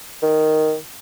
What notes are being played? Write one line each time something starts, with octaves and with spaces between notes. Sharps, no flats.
D#3